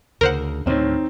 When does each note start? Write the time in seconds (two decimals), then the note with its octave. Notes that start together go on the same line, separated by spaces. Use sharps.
0.21 D2 C#3 A#4 C5 F#5
0.66 D2 A2 D#3 C4 D#4 C#5